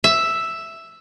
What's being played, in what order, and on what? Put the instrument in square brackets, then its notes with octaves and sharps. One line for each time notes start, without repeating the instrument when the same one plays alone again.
[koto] E5